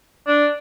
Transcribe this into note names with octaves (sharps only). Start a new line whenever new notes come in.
D4